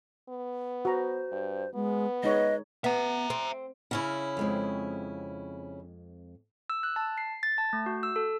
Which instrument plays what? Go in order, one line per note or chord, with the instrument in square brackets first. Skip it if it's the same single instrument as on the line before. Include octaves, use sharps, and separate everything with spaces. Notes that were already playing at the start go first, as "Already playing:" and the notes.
[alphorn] B3
[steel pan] F#4 A#5 [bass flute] C5
[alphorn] G2
[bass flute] G#3 [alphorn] B3
[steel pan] G#3 D#4 C#5 [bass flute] B4 [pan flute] D#5
[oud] B3 [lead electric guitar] E5 A#5
[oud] C4
[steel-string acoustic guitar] C#3 C#4 E4
[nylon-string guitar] F2 G#3 C4
[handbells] E6
F#6
A5
C7
A6
A5
A3
F#4
E6
A4